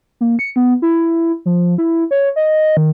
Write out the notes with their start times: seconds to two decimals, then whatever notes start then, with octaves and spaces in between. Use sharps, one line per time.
0.21 A#3
0.39 C#7
0.56 B3
0.82 E4
1.46 F3
1.78 E4
2.11 C#5
2.36 D#5
2.77 D#3